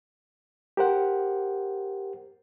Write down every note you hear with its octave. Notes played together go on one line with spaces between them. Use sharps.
G4 A#4 C5 F#5